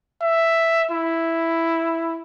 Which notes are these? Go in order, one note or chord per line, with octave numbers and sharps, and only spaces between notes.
E5
E4